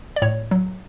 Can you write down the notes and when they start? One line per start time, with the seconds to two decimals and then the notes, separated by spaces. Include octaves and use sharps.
0.16 D5
0.22 A2 C#5
0.51 F#3